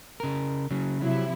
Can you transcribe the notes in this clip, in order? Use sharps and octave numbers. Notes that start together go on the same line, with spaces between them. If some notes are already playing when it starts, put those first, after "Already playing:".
C#3 A#4
C#3 F#3
C3 F3 F#3 E4